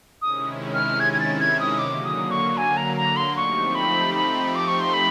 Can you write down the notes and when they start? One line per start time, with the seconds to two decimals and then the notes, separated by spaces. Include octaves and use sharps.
0.21 C3 D#3 G#3 C#4 E4 D#6
0.74 F6
1.00 G#6
1.13 G#6
1.20 A6
1.40 G#6
1.60 D#6
1.79 D3 F#3 A#3 D6
2.05 D#6
2.31 C#6
2.57 G#5
2.77 A#5
2.97 A#5
3.17 C6
3.35 F3 A3 C4 D#4 G4 C#6
3.75 B5
4.14 B5
4.55 D6
4.68 C#6
4.80 C6
4.94 B5